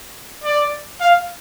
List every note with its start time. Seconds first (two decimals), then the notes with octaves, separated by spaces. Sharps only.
0.44 D5
1.00 F5